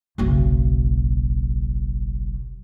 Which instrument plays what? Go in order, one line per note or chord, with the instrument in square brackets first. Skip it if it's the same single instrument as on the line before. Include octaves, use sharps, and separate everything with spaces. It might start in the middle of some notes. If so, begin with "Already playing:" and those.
[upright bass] F#1 B1